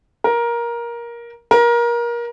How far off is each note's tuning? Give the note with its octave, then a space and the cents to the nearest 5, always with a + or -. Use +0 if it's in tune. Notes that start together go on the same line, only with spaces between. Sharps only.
A#4 +15
A#4 +25